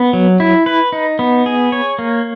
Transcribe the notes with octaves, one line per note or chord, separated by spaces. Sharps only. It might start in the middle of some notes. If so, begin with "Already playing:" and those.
Already playing: B3
F#3
E4
B4
D#4
B3
G#4
C#5
A#3